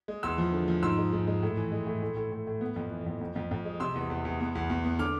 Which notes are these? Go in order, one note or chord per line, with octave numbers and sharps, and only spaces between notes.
G#3
E2 C6 E6
F3
D3
F3
G#2 C6 E6
G#3
G#2
G#3
A2
E3
G#3
A2
A2
A2
A2
A2
B3
F2
E3
F2
F2
F2
F2
G#3
C3 C6 E6
E2
E2
E2
B3
E2
E2
B3
D3 D6 F6